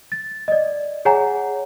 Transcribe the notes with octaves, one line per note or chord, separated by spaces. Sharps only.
A6
D5 D#5
G#4 C#5 F#5 G#5 A#5